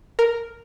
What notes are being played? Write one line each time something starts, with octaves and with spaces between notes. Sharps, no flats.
A#4